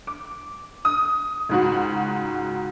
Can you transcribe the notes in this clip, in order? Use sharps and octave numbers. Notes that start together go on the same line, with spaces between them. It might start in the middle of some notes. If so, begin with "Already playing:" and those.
D6
D#6
C#2 G#2 F#4